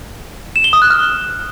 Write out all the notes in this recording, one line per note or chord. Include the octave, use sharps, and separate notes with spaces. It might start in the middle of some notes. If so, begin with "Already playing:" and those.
E7
G7
D#6
F#6
F6